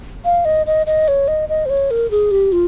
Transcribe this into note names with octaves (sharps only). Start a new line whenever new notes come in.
F5
D#5
D#5
D#5
C#5
D#5
D#5
C5
C#5
A#4
G#4
G4
F4